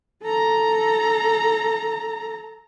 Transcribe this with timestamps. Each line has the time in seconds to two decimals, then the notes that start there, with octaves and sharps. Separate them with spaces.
0.23 A4 A#5